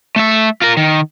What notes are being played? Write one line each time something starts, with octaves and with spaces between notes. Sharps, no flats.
A3 E5
F4 A#4
D#3